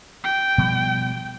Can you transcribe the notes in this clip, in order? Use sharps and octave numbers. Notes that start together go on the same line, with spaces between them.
G5
B2 F3 G3